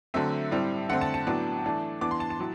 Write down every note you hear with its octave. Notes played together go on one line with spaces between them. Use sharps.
D3 F#3 A3 C4 E5
A2 G3 C4
D3 A3 C4 F#5
A5
A5
A2 F#3 B3 D4
E3 A3 D4
E3 B3 D4 D6
C6
A5
A5
A2 F#3